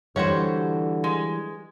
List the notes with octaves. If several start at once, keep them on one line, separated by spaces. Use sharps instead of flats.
D3 E3 G3 F#4 G4 C5 C#5
G#3